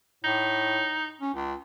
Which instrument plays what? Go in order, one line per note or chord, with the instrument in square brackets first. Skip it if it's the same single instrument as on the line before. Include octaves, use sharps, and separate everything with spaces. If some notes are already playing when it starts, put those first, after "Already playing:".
[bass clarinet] A2 [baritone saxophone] D#4
[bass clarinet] C#4
C#2